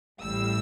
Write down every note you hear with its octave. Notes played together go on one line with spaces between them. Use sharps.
A1 A2 G3 E6